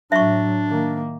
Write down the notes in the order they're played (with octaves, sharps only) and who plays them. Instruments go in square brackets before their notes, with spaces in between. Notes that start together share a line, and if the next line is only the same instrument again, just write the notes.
[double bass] A2 F#3 [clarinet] D4 [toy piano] E5 C#6
[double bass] D#3 A#3